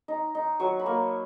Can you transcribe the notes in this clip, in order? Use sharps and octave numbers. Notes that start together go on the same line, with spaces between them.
D#4
D#4
F#3 C#6
B5
A#3